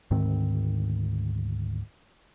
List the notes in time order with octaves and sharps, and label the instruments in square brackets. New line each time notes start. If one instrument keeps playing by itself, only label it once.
[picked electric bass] D2 G#2 D#3 C4